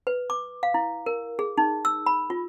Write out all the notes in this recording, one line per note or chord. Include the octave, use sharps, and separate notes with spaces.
B4
D6
F5
E4
A#4
G#4
D#4
E6
B5
F4